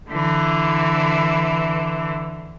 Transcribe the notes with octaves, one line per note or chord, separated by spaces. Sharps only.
D3 E3